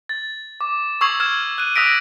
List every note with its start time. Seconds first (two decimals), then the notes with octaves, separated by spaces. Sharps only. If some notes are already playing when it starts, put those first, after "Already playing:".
0.09 A6
0.61 D6
1.01 C#6 D#6 E6 G#6 C7 F#7
1.20 E6 F6 G#6 E7
1.58 F#6 D#7
1.76 D#6 E6 F#6 A#6 B6 D7